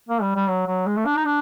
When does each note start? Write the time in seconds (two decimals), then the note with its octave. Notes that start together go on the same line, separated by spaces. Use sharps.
0.09 A#3
0.22 G3
0.36 G3
0.48 F#3
0.67 F#3
0.86 G#3
0.97 A3
1.06 D4
1.16 D#4
1.25 D4